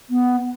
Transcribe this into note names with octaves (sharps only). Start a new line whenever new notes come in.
B3